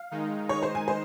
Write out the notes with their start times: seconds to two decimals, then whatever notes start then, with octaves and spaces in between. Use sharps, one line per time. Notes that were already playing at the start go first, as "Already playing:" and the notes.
Already playing: F5
0.11 D#3 G#3 D#4
0.49 C#5
0.63 C5
0.75 G#5
0.88 C5